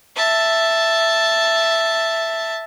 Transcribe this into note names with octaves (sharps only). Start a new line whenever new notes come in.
E5 A5